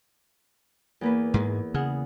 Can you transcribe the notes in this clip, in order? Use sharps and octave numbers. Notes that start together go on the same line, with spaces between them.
E2 A#3 B4
G#2 G#3
C#3 G#4 F#5